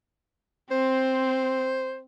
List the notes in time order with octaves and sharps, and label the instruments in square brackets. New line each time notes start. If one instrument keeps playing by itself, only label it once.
[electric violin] C4 [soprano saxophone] C5